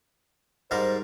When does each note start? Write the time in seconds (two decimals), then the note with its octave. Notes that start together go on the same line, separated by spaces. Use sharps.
0.71 G#2 G3 A#4 C5